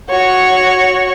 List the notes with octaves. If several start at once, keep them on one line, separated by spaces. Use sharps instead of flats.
F#4 C#5